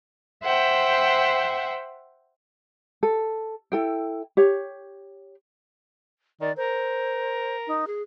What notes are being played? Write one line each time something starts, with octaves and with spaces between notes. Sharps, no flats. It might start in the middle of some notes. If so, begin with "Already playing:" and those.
C5 E5 F#5 G5
A4
E4 A4 G5
G4 C#5
D#3 D5
A#4 C5
D#4
G#4